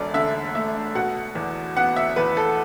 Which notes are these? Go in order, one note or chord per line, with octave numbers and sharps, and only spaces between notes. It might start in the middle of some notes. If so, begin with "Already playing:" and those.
Already playing: E1 D2 A4 D5
D3 E5
A3 E5
B2 F#5
E2
B3 F#5
E5
E2 B4
A4